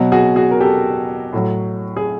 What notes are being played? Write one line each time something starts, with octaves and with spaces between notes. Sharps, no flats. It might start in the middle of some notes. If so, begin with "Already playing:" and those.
Already playing: B2 F#3
F#4 G#4
F#4 G#4
A#4
G4 A4
A2 F#3
G#4